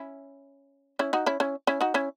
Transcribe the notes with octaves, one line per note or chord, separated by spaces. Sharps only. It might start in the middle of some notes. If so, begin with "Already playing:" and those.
Already playing: C#4 E4
C#4 E4
D#4 F#4
C#4 E4
C#4 E4
C#4 E4
D#4 F#4
C#4 E4